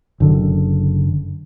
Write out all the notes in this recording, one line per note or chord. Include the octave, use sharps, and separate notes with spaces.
F#1 D3